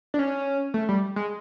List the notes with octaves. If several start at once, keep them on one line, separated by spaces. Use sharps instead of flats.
D4
C#4
A3
G3
G#3